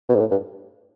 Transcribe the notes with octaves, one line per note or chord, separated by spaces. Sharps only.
B2
G#2
A2
G2